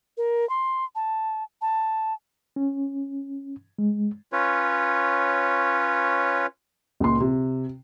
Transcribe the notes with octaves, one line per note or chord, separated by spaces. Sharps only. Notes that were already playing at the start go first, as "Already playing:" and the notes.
A#4
C6
A5
A5
C#4
G#3
C#4 F4 B4 C#5
C#2 A#2 C6
C3